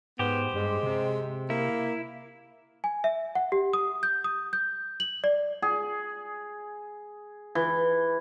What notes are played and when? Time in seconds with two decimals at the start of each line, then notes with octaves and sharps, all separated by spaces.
0.19 G#2 B3 G4 C5
0.54 G2 G#3
0.83 C3
1.50 A#3 E4
2.84 G#5
3.04 E5
3.35 F#5
3.52 G4
3.73 D#6
4.03 G6
4.24 D#6
4.53 G6
5.00 F#7
5.24 D5
5.62 G#4
7.55 E3